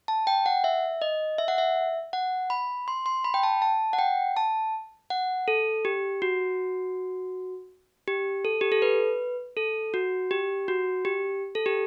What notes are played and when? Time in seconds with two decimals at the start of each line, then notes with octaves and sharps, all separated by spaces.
0.08 A5
0.27 G5
0.46 F#5
0.64 E5
1.02 D#5
1.38 E5
1.48 F#5
1.58 E5
2.13 F#5
2.50 B5
2.88 C6
3.06 C6
3.24 B5
3.34 G5
3.43 A5
3.62 A5
3.93 F#5
3.99 G5
4.37 A5
5.10 F#5
5.48 A4
5.85 G4
6.22 F#4
8.08 G4
8.45 A4
8.61 G4
8.72 A4
8.82 B4
9.57 A4
9.94 F#4
10.31 G4
10.68 F#4
11.05 G4
11.55 A4
11.66 G4